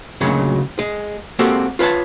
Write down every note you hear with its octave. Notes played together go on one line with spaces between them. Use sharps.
D2 A#2 C#3 F#3 G#3 C#4
G#3
G#3 A#3 C4 F#4 G4 A4
F4 B4 C#5 A5